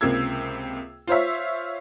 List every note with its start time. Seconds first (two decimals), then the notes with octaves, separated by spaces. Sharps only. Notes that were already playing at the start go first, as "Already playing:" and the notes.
0.01 C#2 C3 A#3 E6 G#6
1.07 F4 C5 C#5 E5